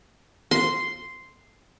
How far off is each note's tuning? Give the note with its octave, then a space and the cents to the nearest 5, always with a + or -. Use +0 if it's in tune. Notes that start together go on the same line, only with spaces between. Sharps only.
C6 -5